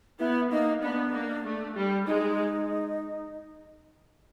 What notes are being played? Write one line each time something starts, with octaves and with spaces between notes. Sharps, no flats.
B3 E4
A#3 D#4
B3 D4
A#3
A3
G3
G#3 D#4